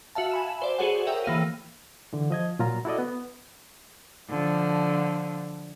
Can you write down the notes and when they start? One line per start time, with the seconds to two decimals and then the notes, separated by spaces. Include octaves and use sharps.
0.15 F#4 E5 F5 A5
0.31 G#5 B5 E7
0.62 C5 D5
0.79 F#4 G#4 A4 C5 C#5 F#5
1.07 A#4 E5 G5
1.24 E3 A#3 F5 D#7
2.13 D3 E3
2.30 F3 D#5 G#6
2.59 A#2 F#3 F4 A#5
2.85 E4 F#4 A4 D5 D#5
2.98 B3
4.30 D3 F3